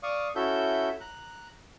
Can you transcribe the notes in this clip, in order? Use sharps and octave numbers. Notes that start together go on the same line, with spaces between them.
D5 F5 C#6 D#6
C#4 E4 F#4 A4 E5 G6
A#5 F#6